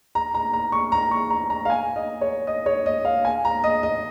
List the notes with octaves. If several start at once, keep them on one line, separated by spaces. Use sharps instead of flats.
A#5
A#5
A#5
C#6
A#5
C#6
A#5
A#5
F5
G#5
D#5
C#5
D#5
C#5
D#5
F5
G#5
A#5
D#5
D#5